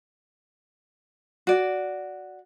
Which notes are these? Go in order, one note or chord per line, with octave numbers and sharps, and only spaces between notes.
F#4 D5